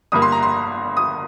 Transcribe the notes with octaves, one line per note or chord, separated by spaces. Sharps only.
G1 G2 G3 A#3 D#6
C6
A#5
C6
D#6